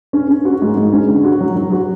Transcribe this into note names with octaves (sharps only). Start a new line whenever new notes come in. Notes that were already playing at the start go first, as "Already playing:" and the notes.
C#4
C#4
F#4
G#2
G#2
C#4
D3
F#4
F#3
F#3
F#4